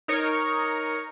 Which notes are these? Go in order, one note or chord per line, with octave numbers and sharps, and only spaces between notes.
D#4 A#4 C#5